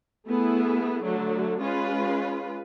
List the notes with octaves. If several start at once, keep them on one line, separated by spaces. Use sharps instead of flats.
A3 B3 E4 G#4
D3 F#3 A3
G#3 C#4 F4 B4